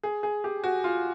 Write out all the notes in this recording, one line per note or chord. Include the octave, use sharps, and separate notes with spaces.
G#4
G#4
G4
F#4
F4